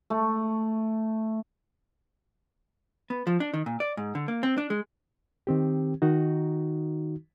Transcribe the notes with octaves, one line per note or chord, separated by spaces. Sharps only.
A3
B3
F3
D4
D#3
A#2
D5
G#2
D3
A#3
C4
D4
G#3
D#3 C4 G4
D#3 D#4 F#4